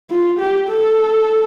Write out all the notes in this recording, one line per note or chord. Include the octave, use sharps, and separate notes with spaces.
F4
G4
A4